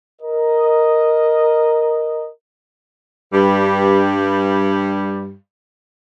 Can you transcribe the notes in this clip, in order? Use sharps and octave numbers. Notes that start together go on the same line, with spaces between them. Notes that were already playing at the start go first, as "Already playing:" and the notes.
A#4 D#5
G2 G3